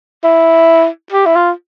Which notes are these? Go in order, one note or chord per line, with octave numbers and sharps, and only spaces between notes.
E4
G4
E4
F4